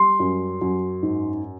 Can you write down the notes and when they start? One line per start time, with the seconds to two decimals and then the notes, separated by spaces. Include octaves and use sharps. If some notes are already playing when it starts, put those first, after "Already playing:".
Already playing: G3 C6
0.20 F#2
0.61 F#2
1.03 G#2